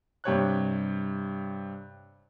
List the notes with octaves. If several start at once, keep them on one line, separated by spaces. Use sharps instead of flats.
G2 C3 C#5 F#6